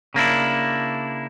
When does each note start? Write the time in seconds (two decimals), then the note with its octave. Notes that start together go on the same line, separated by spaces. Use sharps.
0.14 C#3 A#3 D4 E4